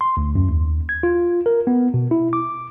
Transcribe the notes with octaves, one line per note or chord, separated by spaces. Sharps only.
C6
D2
F#2
D#2
G#6
F4
A#4
B3
B2
E4
D6